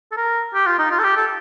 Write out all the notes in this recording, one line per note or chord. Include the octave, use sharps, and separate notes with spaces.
A4
A#4
G4
F4
D#4
F4
A4
G4
A4